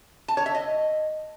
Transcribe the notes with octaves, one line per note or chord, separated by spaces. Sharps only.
A5
C#5
E5
D#5